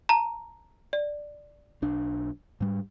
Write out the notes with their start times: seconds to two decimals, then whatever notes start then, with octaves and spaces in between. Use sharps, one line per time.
0.09 A5 A#5
0.93 D5
1.82 B1 D4
2.60 G#2 G3